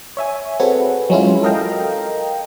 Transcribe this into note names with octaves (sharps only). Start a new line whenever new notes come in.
C#5 E5 G#5
C4 F#4 G#4 A4 B4 C#5
F#3 G#3 C#4 E4 F4
A4 A#4 D#5 F5 G5 A#5